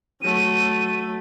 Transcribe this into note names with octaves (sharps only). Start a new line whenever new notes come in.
F#3 A3 D#7